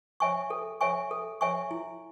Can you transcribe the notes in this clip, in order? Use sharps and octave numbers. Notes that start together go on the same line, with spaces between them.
C#5 E5 G#5 C#6
A4
C#5 E5 G#5 C#6
A4
C#5 E5 G#5 C#6
E4